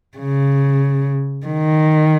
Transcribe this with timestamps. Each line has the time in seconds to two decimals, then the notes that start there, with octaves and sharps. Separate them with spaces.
0.18 C#3
1.47 D#3